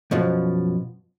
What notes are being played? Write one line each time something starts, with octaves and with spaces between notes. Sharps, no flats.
F#2 B2 F3